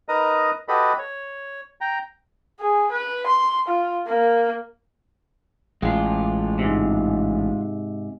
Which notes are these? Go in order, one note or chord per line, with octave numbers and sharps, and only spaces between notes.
D#4 A#4 B4 D#5 A#5 D#6
F#4 G4 A4 B4 D#5 B5
C#5
G5 A#5
G#4
B4
C6
F4
A#3
A1 G#3 F4
G#2 C3